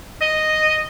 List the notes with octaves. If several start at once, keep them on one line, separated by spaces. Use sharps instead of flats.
D#5